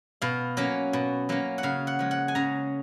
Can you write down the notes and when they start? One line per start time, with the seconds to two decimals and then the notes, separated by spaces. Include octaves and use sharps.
0.22 B2 F5
0.57 F#3 A#3 C#4
0.93 B2
1.29 F#3 A#3 C#4
1.58 F#5
1.63 C#3 F5
1.87 F#5
1.99 F3 G#3
2.11 F#5
2.28 G#5
2.35 C#3 A#5